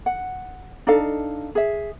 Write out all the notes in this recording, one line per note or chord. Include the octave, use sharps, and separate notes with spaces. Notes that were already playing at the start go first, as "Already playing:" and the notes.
F#5
D4 D#4 A4 F5
G#4 E5